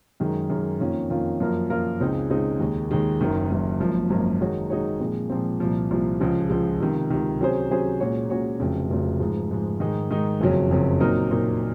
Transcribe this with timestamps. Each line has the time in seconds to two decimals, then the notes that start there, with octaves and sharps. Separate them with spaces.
0.20 F#2 D#3 G#3
0.50 F#2 D#3 G#3
0.79 F2 D#3 A#3 C#4 F4
1.10 F2 D#3 A#3 C#4 F4
1.40 F#2 F3 A#3 F4 A#4
1.70 F#2 F3 A#3 F4 A#4
2.00 C#2 C#3 G#3 C4 D#4
2.30 C#2 C#3 G#3 C4 D#4
2.60 D#2 D#3 G#3
2.91 D#2 D#3 G#3
3.21 F#1 F#2 D#3
3.50 F#1 F#2 D#3
3.80 G#1 F#2 F3 A#3
4.10 G#1 F#2 F3 A#3
4.41 D#3 G#3 D#4 F#4 C#5
4.70 D#3 G#3 D#4 F#4 C#5
5.00 A#2 F3 G#3 C4
5.30 A#2 F3 G#3 C4
5.60 C2 A#2 F3
5.91 C2 A#2 F3
6.20 C#2 C#3 F3 G#3
6.50 C#2 C#3 F3 G#3
6.80 C#2 C3 D#3
7.10 C#2 C3 D#3
7.40 C3 F#3 C#4 G#4 C5
7.71 C3 F#3 C#4 G#4 C5
8.00 A#2 G#3 C#4 F#4 C#5
8.30 A#2 G#3 C#4 F#4 C#5
8.60 F1 F2 C#3 F#3
8.90 F1 F2 C#3 F#3
9.20 G#2 F3 G#3
9.51 G#2 F3 G#3
9.80 G#2 D#3 G#3 D#4
10.10 G#2 D#3 G#3 D#4
10.40 F#1 F2 C#3 F#3 C#4
10.71 F#1 F2 C#3 F#3 C#4
11.00 A#2 F#3 C4 D#4 A#4
11.31 A#2 F#3 C4 D#4 A#4